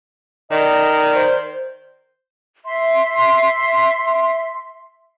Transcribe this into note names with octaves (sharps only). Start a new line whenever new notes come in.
D#3 D5 D#5
C5
E5 C6